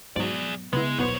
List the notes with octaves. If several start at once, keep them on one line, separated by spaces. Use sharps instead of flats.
G#2 B2 F#3 B3 G#4 D5
C#3 G#3 B3 E4
D#1 B1 D#3 B3 C5 C#5